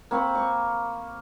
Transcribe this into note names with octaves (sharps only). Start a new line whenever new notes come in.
A#3 C4 B5 C#6
C#6